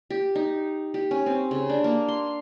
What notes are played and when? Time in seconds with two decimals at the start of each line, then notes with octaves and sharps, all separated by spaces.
0.10 G4
0.35 D#4
0.94 G4
1.11 C#4
1.26 C4
1.51 C#3
1.70 D4
1.84 A#3
2.08 C6